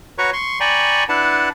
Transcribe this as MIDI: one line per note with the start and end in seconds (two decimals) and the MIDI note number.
0.18 0.30 66
0.18 0.30 71
0.18 0.30 73
0.18 0.30 82
0.18 0.30 85
0.33 0.60 84
0.33 0.60 85
0.60 1.04 74
0.60 1.04 79
0.60 1.04 80
0.60 1.04 82
0.60 1.04 83
0.60 1.04 85
1.09 1.49 62
1.09 1.49 64
1.09 1.49 71
1.09 1.49 78
1.09 1.49 81